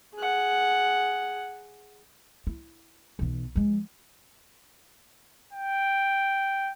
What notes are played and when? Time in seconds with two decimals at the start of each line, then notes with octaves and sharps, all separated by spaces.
0.15 G#4 F#5
2.47 E4
3.19 B1 E3
3.56 F3 G#3
5.53 G5